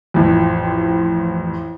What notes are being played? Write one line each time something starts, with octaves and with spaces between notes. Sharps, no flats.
A1 F2